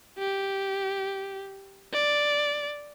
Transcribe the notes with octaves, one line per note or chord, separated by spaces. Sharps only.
G4
D5